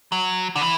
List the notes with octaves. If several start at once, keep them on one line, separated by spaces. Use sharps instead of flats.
F#3
D3
E3